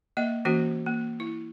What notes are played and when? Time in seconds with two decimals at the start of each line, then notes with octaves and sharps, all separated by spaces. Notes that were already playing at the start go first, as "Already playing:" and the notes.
0.17 A#3 D#5 E5
0.45 E3 A#3 C#4 F#4
0.86 A#3
1.20 E4